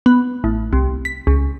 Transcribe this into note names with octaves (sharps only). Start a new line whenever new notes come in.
B3
A1
C2
B6
C#2